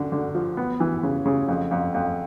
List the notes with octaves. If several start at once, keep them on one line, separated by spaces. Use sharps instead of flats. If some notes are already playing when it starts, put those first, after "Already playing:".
Already playing: F#2 D3
D3
F3
B3
E3
C#3
C#3
F2
F2
F2